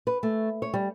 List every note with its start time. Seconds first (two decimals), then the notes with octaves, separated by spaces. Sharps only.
0.07 B4
0.23 A3
0.62 C#5
0.74 G3